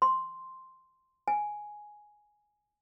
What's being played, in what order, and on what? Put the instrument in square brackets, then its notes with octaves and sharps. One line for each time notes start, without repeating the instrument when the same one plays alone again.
[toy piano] C6
G#5